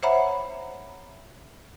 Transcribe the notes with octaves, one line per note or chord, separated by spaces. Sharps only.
C5 C#5 E5 F#5 A#5 B5